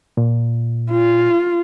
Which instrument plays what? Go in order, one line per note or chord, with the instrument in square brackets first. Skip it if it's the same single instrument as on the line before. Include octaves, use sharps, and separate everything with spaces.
[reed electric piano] A#2
[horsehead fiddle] F4